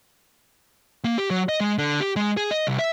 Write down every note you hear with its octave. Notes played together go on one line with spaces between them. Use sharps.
A#3
G4
F#3
D#5
G#3
D3
G4
G#3
G#4
D#5
C2
E5